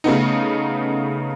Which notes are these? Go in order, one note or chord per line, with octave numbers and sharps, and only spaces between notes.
C#3 A3 B3 D#4